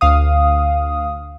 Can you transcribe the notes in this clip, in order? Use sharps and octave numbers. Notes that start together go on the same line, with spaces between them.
D2 F5 D#6